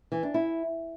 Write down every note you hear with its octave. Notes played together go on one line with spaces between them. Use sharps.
E3
D4
E4